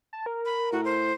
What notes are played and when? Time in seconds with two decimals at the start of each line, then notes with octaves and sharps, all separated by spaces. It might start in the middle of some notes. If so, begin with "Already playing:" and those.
0.13 A5
0.26 A#4
0.45 B5
0.72 A2 F#4
0.85 C5